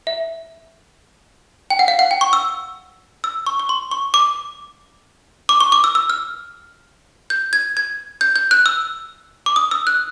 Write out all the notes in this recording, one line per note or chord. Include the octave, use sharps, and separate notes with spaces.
E5
G5
F#5
F5
F#5
G5
C#6
E6
E6
C#6
C#6
C6
C#6
D6
D6
C#6
D6
E6
E6
F6
G6
G#6
G#6
G6
G6
F#6
E6
D6
D#6
E6
F#6